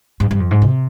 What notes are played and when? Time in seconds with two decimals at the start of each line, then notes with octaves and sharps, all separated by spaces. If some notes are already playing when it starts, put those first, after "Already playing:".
0.20 G2
0.31 G2
0.40 F2
0.51 G#2
0.62 C3